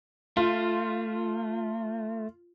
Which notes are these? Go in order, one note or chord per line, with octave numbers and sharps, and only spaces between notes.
A3 F4